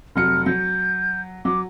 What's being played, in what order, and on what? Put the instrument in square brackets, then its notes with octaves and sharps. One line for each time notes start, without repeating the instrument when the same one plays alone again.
[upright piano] F1 F#3 C#7 [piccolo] F6
[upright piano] F#3 [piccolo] G6
[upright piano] F#3 [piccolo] D6